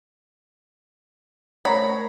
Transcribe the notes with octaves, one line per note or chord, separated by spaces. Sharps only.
A3 A#4 C5 C#5 A#5 B5